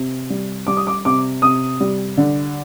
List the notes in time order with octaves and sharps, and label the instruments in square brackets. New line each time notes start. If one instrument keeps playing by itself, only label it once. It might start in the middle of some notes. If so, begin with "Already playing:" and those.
Already playing: [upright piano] C3
G3
G3 D6
D#6
D6
C3 D6
C3 D#6
G3
D3